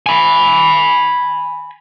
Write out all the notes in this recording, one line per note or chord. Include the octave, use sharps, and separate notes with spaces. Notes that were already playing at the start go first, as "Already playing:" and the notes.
G#5 B5